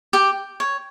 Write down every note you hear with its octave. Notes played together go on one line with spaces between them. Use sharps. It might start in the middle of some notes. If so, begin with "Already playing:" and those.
G4 G5
C#5